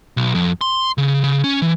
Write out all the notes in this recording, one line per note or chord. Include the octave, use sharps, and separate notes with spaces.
B1
F2
C6
C#3
C#3
C#4
E3